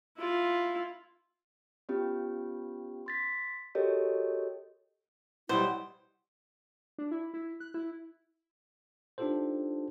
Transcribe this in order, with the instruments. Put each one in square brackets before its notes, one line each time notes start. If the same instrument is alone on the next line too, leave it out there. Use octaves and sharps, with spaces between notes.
[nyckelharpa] E4 F4
[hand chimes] B3 C#4 F4 G4
C6 A6 B6
F#4 G4 A4 A#4 C#5 D#5
[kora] B2 F#3 G3 [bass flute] E4 [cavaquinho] C5
[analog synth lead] D4
E4
E4
F#6
E4
[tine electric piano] D4 D#4 F4 G4 A4 C5